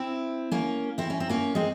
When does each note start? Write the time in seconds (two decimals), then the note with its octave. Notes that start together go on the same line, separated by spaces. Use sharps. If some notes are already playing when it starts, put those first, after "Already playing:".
Already playing: C4 E4
0.52 A#3 C#4
0.98 C4 E4
1.10 C#4
1.20 C4
1.29 A#3 C#4
1.55 G#3 C4